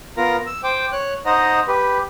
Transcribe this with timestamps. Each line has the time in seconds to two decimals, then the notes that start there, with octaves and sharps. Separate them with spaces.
0.17 B3 F4 A#4 A#5
0.47 E6
0.64 C5 G5 D6
0.92 C#5 F#6
1.26 D#4 C5 D#5 F#5 A#5
1.68 G4 B4